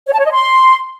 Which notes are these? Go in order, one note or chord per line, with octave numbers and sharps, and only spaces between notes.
C#5
A5
C#5
D#5
C6